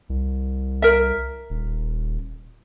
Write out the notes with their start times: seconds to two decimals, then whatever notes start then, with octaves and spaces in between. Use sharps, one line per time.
0.10 C2
0.82 A#4 E5
1.50 D#1